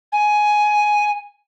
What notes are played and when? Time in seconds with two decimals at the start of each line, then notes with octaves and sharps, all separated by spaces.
0.12 G#5